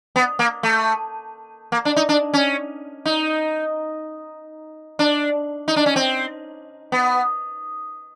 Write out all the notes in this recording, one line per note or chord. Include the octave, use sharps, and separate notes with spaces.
B3
A#3
A3
A#3
D4
D#4
D4
C#4
D#4
D4
D#4
D4
C#4
C4
B3